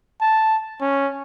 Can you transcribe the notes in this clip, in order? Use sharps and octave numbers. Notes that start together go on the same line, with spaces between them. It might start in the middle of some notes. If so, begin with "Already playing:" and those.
A5
C#4